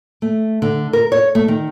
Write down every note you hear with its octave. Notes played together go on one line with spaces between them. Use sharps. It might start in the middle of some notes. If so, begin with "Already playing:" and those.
A3
D3
A#4
C#5
A3
D#3